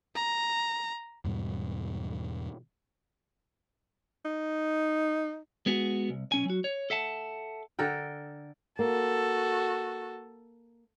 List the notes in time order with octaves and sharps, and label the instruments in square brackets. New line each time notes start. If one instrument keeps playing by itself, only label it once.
[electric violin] A#5
[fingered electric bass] E2 G#2 B2 G3
[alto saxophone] D#4
[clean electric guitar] G#3 B3 F#4 G#4
C2
B1 C#4 G#5
F#3 F#4
C#5
A4 E5 F#5 A5
[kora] D3 A4 A#4 G5
[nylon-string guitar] A#3 [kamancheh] F#4 A4